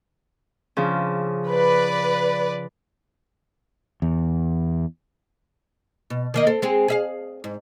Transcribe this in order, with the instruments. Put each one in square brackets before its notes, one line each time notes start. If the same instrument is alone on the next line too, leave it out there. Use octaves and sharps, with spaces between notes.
[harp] C#3 F3 D4
[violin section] B4 D5
[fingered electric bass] E2
[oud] B2
D#3 A#3 D#5
C4 A4
G#3 C4 G#4
G#4 E5 F5
G#2